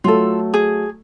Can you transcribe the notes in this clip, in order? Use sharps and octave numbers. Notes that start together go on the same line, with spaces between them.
F#3 A3 F4 A4
G#4